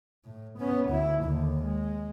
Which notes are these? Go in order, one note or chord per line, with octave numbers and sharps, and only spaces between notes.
A2
B3 C#4
D2 E4
D#2 D3
G#3